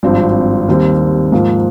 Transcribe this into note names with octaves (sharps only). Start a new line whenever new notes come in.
G#1 G2 F3 C4
D#2 D#3 G3 C4
G#2 F3 A#3